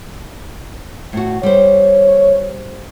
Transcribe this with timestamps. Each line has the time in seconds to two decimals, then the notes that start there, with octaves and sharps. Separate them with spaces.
1.13 A2 F#4
1.43 G3 C5 C#5